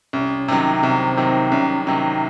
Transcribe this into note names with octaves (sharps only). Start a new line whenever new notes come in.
C2 C#4
C3 D#3 F#3
C2 C4
C3 D#3 F#3
C2 C#4
C3 D#3 F#3 C#4